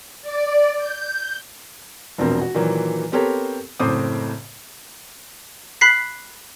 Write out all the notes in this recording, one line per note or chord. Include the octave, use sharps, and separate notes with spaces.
D5
G6
E1 A#1 B2 C4 A#4
F#4
A#2 D#3 E3 F#3
B3 C4 G4 A4 A#4 C#5
F#1 A2 C4 C5 D6 D#6
B5 F#6 B6 C7